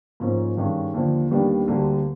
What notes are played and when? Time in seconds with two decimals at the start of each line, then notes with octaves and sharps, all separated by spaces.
0.20 G#2 F3 A#3 C#4
0.57 G2 D#3 G#3 C#4
0.94 D#2 D3 F3
1.31 D#2 D#3 G3 B3 D4
1.68 D2 D3 G3 A#3